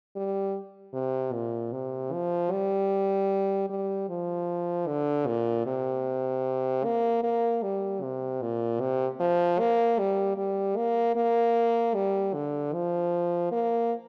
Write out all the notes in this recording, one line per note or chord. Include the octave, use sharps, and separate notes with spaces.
G3
C3
A#2
C3
F3
G3
G3
F3
D3
A#2
C3
A#3
A#3
G3
C3
A#2
C3
F3
A#3
G3
G3
A#3
A#3
G3
D3
F3
A#3